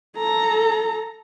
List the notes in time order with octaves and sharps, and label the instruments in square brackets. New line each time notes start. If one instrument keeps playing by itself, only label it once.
[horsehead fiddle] A4 A#5